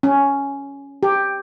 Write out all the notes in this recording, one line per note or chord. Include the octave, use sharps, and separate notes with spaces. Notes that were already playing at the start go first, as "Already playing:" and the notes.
C#4
G4